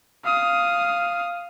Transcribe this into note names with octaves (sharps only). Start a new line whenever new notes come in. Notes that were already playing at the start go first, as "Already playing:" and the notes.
F5 D#6